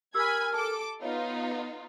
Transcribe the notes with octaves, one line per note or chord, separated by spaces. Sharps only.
G4 A#4 G#5 B5 E6 G#6
A4 A5 D6
B3 D#4 F4 C#5 F5
A4